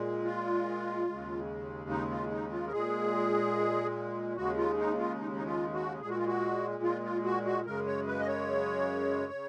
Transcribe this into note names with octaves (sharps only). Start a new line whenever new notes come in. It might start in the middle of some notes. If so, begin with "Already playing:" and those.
Already playing: A#2 G#3
F4
D#2 C#3 G#3
D#4
F4
D#4
F4
A#4
A#2 G#3 G#4
D#2 C#3 G#3 F#4
F4
D#4
F4
D#4
D#4
F4
F#4
A#2 G#3 G#4
F#4
F4
F#4
F4
F4
F#4
F#4
F#2 C#3 G#3 A#4
C#5
B4
D#5
C#5
C#3